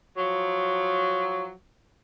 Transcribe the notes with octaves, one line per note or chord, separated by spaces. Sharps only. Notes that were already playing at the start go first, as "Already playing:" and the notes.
F3 F#3